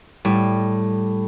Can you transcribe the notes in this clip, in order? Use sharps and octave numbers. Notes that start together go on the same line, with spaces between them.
A2 G3